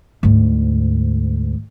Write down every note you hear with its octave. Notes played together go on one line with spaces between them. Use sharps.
D2 G#2